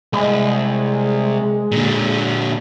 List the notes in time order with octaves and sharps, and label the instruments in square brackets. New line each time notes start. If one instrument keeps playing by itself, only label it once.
[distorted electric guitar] C2 [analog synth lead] G#3
[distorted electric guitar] A#2 D3